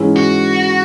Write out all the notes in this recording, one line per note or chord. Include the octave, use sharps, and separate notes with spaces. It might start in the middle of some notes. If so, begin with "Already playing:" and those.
Already playing: G#2 E3 G#3 C#4 E4
F#4